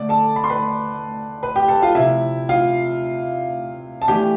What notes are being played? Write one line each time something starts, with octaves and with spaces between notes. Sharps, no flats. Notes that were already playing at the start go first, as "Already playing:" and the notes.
Already playing: D3 A3 D4 D5
A4 A5
B5
C6
B4 B5
B4 B5
G4 G5
A4 A5
F4 F5
C3 F3 C4 E4 E5
F4 F5
A5
E3 A3 D4 G4 G5